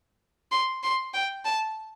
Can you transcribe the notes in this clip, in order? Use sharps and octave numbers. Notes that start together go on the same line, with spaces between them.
C6
C6
G5
A5